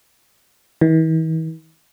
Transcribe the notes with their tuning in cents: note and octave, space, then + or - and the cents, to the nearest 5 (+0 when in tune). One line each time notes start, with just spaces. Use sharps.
E3 -45